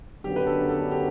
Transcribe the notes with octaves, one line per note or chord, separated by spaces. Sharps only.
F#2 D3 F#3 B3 D4 G4
B4
A4
A4
G4